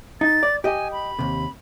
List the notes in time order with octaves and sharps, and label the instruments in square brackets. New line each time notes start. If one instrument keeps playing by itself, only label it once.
[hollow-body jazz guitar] D#4 [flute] A6
[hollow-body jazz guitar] D5
[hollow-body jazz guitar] G4 D#5 [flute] G#5
[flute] B5
[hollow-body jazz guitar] D#2 C3